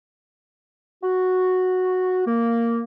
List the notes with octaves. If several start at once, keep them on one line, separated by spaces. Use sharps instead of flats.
F#4
A#3